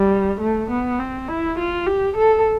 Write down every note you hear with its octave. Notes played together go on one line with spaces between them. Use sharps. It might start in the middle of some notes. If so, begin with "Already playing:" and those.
Already playing: G3
A3
B3
C4
E4
F4
G4
A4